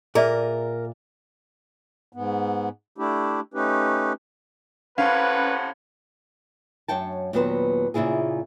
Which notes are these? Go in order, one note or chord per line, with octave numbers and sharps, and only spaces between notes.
A#2 G#4 A#4 D5 E5
G#2 B3
A3 D4 E4 G4
A3 C#4 D#4 G4 B4
A2 C3 C#4 B4 F5 F#5
F#2 C#5 F#5 G5 A5
D#2 A#2 F#3 B3 B4 C5
A#2 C#3 E4 F4 G#4